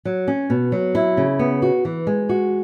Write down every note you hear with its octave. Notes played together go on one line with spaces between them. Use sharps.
F#3
C#4
B2
F#3
E4
C#3
B3
F#4
E3
G#3
F#4